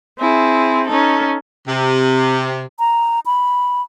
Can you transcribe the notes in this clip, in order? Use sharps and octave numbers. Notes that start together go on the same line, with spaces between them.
C4 E4 G#4
C#4 D#4 A4
C3
A#5
B5